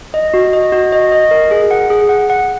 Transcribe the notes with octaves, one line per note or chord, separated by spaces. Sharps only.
D#5
F#4
D#5
F#4
D#5
D#5
A#4
G#4
F#5
G#4
F#5
F#5